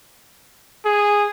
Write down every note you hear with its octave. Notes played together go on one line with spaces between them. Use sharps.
G#4